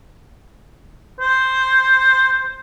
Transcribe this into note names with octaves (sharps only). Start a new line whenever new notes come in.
C5